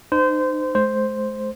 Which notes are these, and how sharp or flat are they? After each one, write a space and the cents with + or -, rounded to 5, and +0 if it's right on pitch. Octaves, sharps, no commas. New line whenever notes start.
D#4 -35 C5 -25
G#3 +40 C5 +0